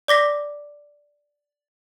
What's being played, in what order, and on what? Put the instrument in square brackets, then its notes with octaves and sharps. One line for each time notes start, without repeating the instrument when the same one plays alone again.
[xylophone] D5 D6 A#6 B6